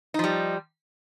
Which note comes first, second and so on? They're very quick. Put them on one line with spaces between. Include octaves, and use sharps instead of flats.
D#4 F3 G3